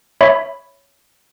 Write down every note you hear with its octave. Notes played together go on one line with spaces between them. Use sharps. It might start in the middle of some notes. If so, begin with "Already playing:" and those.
C#5 E5 B5